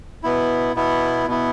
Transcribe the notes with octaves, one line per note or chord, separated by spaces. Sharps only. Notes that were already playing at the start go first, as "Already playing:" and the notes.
B2 B3 E4
B2 B3 E4
B2 B3 E4